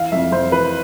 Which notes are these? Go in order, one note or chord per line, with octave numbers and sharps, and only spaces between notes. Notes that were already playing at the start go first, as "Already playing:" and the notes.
Already playing: E3 F5
F2 E5
F2 C5
E3 B4